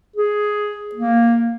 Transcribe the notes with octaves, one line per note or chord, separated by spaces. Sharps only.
G#4
A#3